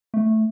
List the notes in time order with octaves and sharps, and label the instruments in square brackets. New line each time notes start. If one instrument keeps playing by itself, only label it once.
[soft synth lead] A3